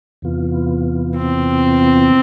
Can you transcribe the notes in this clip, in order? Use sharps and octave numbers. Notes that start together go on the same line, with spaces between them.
E2 C3 E3 B3 F4
C4